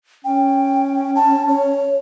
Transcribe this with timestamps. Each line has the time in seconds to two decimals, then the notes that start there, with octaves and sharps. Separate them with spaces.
0.24 C#4 G5
1.16 A5
1.48 C#5